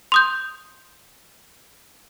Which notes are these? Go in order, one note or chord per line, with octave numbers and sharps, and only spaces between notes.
C6 D#6 G6